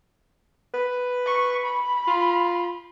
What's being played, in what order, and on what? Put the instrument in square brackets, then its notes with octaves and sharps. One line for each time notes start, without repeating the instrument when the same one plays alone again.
[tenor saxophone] B4
[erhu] C#6
B5
[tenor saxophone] F4